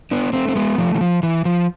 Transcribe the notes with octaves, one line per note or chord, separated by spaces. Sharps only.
B3 D4
A3 C4
C4
G#3 B3
F3 A3
E3
F3
E3
F3